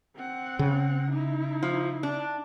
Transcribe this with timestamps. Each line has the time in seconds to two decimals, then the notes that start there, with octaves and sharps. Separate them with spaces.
0.15 C4 F#5
0.59 C#3
1.11 D#4 E4
1.63 F3
2.03 D4